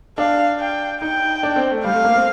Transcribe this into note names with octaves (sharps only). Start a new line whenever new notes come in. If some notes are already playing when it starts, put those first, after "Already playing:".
D4 F5
G5
D#4 G5
D4
C4
A3
G3 F5
A3
A#3
C4